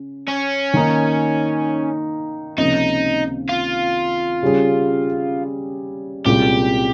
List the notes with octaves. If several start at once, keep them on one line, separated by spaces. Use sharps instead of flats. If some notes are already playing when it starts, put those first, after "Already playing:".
Already playing: C#3 C#4
C#4
D#3 A#3 D#4
C#2 C3 F3 A#3 C#4 D#4
F4
C#3 G3 C#4 G#4
C2 A#2 G#3 C#4 F4 G4